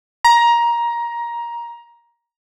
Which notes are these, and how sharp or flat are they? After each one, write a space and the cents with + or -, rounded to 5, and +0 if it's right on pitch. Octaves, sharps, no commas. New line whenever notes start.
A#5 +15